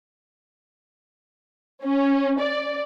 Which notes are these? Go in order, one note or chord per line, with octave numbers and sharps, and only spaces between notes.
C#4
D5